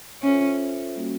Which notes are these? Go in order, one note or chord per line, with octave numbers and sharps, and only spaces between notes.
C#4 F4 A4 C5 E5
G3 A#3 C#4 F#4